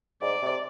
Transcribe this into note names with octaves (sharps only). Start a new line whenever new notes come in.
G#2 D5
C3